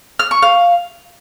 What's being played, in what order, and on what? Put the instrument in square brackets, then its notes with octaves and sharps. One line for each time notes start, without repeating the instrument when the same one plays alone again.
[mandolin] F6
C#6
F5